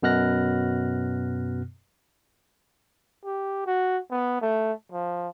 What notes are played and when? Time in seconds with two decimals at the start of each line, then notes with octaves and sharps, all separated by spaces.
0.03 F#2 B2 B3 F6 F#6 A#6
3.25 G4
3.66 F#4
4.11 B3
4.42 A3
4.92 F3